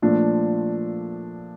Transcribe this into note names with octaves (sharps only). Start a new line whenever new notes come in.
A#2 F3 A3 D4